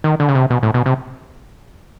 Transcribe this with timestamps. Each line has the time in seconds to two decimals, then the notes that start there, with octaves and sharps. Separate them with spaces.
0.04 D#3
0.20 D3
0.29 C#3
0.35 C3
0.50 B2
0.63 A2
0.74 B2
0.86 C3